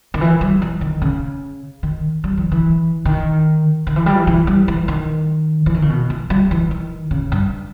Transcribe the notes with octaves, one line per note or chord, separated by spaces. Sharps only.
D#3
E3
G3
E3
D#3
C#3
D#3
G3
E3
E3
D#3
D#3
E3
G3
E3
E3
G3
E3
D#3
E3
D#3
C#3
B2
E3
G3
E3
D#3
C#3
G2